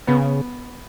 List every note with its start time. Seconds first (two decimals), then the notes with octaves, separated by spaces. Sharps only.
0.07 C#3 B3